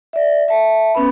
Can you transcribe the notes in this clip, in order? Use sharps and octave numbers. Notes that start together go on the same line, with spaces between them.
D5 E5
E5 A5
B3 C#4 B4 B5